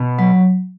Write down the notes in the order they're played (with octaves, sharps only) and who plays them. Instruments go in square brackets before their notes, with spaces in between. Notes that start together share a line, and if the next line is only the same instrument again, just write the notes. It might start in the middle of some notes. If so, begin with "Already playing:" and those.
Already playing: [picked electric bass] B2
[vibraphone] F#3